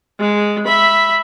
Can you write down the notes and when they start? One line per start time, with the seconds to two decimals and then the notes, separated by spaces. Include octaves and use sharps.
0.19 G#3
0.65 E5 B5